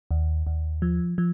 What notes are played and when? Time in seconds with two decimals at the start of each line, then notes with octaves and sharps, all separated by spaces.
0.11 D#2
0.47 D#2
0.82 F3
1.18 F3